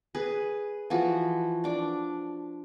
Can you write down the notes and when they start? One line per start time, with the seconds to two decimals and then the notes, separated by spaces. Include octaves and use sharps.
0.15 G#4 B4
0.90 E3 F3 F#4
1.64 D4 D6